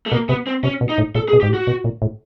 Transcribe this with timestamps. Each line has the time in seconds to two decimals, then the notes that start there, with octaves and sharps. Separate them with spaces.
0.06 A3
0.12 B2 A#3
0.29 C3 B3
0.47 C4
0.63 C3 C#4
0.81 B2
0.89 D#4
0.98 A2
1.15 A#2 A4
1.28 G#4
1.33 B2
1.41 G#2 G4
1.49 A2
1.54 F#4
1.67 B2
1.84 A#2
2.02 A2